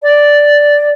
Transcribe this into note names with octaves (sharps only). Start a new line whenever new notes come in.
D5